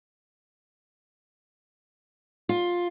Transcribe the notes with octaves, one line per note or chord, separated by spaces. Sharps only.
F4